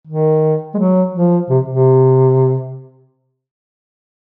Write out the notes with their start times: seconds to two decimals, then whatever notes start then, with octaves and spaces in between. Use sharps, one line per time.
0.07 D#3
0.74 G#3
0.78 F#3
1.13 F3
1.50 C3
1.68 C3